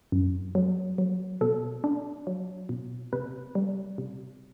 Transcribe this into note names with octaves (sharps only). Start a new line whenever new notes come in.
F#2
F#3
F#3
B2 A4
D4
F#3
B2
C3 B4
G3
C3